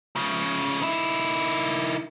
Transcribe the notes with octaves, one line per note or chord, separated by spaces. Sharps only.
C#3 F3
D#3 E4